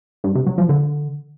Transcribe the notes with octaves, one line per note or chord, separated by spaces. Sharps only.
G2
C3
F#3
F3
D3